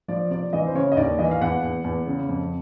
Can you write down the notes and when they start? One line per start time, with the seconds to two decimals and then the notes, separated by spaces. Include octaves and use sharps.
0.08 F3 D5
0.30 C3 D5
0.53 E3 D#5
0.67 C5
0.75 C#3 C#5
0.92 D#5
0.96 D#2 D5
1.19 E3 D#5
1.31 F5
1.41 E2 F#5
1.63 E2
1.84 E2
2.07 C#3
2.29 F2